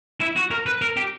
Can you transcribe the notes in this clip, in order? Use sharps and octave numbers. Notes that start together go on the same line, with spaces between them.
E4
F#4
A#4
B4
A#4
G4